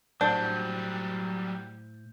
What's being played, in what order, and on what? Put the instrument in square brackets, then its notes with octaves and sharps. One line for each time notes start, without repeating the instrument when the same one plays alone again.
[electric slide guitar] A2 C5 F#5 [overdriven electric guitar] F#3 G3 [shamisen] D4 [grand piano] G6